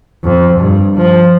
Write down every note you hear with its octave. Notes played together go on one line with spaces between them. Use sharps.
F2
G2
F3